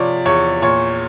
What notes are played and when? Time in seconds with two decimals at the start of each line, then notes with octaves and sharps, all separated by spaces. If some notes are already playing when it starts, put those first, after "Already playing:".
Already playing: C3 F3 C#5 D5
0.25 E2 C#5
0.62 A#2 C#5